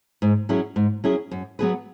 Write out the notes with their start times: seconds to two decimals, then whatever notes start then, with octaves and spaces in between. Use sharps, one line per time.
0.22 G#2
0.49 F#3 C#4 E4 G#4
0.76 G#2
1.04 F#3 C#4 E4 G#4
1.31 F#2
1.59 F#3 B3 G#4 B4